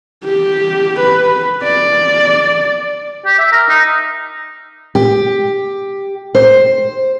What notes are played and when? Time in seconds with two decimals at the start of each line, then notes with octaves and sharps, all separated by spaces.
0.24 G4
1.00 B4
1.63 D5
3.26 G4
3.39 E5
3.52 A#4
3.69 D#4
4.95 G4
6.35 C5